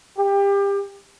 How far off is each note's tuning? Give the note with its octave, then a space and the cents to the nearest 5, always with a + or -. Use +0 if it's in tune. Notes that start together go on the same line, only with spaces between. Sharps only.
G4 +25